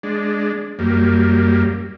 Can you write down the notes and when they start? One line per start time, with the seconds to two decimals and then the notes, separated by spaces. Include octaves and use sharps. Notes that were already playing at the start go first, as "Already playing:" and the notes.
0.03 G#3 D4
0.79 F#2 G3 A#3